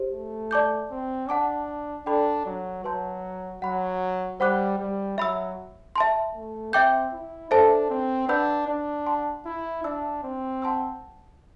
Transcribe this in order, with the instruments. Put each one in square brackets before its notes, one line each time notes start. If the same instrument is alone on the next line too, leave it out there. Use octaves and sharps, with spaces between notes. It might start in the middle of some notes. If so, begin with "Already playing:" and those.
Already playing: [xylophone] G4 C5
[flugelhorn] A3
[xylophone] D5 A5 D6 G6
[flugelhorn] C4
[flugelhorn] D4 [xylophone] F#5 A5 D6
[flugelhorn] D4 [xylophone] A4 D5 G5 B5 D6
[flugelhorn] F#3
[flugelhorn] F#3 [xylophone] B4 E5 A5 C6 G6
[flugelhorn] F#3 [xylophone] F#5 B5 F#6
[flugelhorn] G3 [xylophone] C5 F#5 B5 D6 F#6
[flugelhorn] G3
[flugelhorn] F#3 [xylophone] E5 B5 E6
[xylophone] E5 A5 C6
[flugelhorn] A3
[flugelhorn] C4 [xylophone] E5 G5 D6 G6
[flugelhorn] E4
[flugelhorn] D4 [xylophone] A4 C5 E5 A5
[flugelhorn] C4
[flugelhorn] D4 [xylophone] B4 F#5 B5 E6 G6
[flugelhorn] D4
[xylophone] F#5 A5 C6
[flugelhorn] E4
[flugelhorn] D4 [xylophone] E5 A5 E6
[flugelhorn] C4
[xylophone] F#5 A5 C6 E6